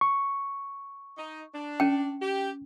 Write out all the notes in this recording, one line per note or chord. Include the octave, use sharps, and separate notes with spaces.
C#6
D#4
D4
C#4 G5
G4